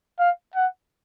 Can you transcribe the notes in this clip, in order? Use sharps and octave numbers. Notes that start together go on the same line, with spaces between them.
F5
F#5